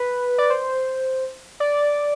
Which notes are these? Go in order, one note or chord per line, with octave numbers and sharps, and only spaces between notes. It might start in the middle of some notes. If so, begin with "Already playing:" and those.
Already playing: B4
D5
C5
D5